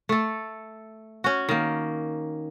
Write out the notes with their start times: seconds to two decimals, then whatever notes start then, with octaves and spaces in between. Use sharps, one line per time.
0.09 A3 A4
1.24 C#4 F#4
1.49 D#3 A#3